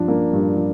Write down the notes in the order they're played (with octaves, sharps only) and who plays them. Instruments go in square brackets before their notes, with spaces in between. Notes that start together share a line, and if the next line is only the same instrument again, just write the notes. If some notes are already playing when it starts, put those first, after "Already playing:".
Already playing: [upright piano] G2 F3 D4
A#3
G2
F3